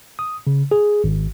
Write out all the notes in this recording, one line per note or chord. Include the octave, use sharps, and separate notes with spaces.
D#6
C#3
G#4
G#1